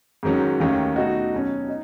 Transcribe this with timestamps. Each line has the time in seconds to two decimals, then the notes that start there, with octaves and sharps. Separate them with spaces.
0.23 G#2 D#3 F#3 C#4
0.60 D#2 D#3 A3 C#4
0.96 B2 A3 D#4 F#4
1.33 B2 F#3 C#4
1.68 D#4